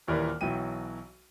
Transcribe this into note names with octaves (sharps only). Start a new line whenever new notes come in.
D#1 D#2 E3 A#4 D5
B1 E3 F#3 G5 D#7